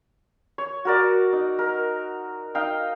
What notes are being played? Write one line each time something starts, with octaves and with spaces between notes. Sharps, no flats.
C#5
F#4 A#4 D5
D#4
A#4
D#4 F5 G5